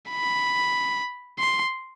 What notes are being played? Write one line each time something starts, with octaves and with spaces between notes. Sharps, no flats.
B5
C6